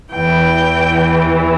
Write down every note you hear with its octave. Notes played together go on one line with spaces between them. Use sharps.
E2 E3 G5